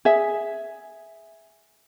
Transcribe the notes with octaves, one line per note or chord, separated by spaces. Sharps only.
G#4 E5